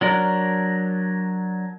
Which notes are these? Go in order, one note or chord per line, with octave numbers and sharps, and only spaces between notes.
F#3 D4 A#4